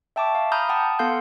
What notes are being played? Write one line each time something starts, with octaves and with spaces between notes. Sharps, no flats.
E5 G5 A5 C#6 D6
F5
A#5 B5 D#6 F6 G6
F#5 G5 A5 D#6
B3 A4 F5 F#5 C6 G6